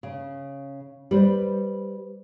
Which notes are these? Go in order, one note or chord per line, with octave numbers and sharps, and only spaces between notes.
C#3
G3 B4 C5